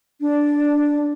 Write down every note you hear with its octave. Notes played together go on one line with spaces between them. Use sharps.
D4